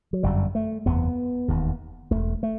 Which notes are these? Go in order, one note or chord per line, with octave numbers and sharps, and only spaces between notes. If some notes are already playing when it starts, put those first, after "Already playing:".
F#3
G1 F#2 G3
A3
F#1 E2 C3 B3
E1 D#2
E1 D#2 A3
A3